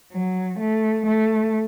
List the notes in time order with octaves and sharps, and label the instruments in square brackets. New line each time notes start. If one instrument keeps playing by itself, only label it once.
[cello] F#3
A3
A3